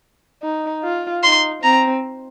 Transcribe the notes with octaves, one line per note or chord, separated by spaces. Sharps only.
D#4
F4
D#4 C6
C4 A#5